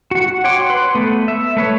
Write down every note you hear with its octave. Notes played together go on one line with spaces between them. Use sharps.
F#4 F#5
C#5 F#5 G5 C6 D6
B4 C6
A3 B3
E5
A3 B4 C#5